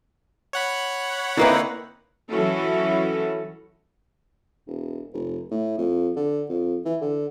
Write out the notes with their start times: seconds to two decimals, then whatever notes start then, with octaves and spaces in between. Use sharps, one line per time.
0.53 C#5 F#5 B5
1.37 D3 A#3 C4 D#4 E4 B4
2.30 E3 F#3 C#4 E4 F#4 A4
4.67 E1
5.13 F1
5.51 A2
5.78 F2
6.16 D3
6.49 F2
6.85 E3
7.01 D3